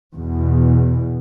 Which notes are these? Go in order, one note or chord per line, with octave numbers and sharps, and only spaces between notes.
E2 B2